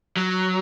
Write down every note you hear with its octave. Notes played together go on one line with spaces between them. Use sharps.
F#3